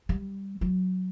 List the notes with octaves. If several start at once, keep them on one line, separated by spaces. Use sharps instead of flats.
G3
F#3